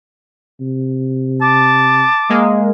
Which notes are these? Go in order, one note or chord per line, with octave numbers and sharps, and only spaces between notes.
C3
A5 D6
G#3 A#3